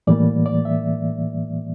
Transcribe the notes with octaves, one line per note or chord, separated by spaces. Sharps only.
A2 E3 G3 A#3 D5
D5
E5